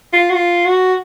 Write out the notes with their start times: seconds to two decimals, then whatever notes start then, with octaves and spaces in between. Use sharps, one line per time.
0.13 F4
0.30 F#4
0.35 F4
0.66 F#4